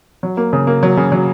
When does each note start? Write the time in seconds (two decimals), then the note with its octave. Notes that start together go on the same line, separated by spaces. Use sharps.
0.23 F#3
0.37 A#3
0.53 C#3
0.67 A#3
0.83 F#3
0.97 C#3
1.12 F#3